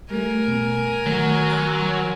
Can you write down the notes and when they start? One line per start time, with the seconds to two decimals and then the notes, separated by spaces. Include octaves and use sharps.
0.10 G3 A3 A#4 G#5
0.47 B2
1.06 D#3 F#3 A3
1.50 A#5 C6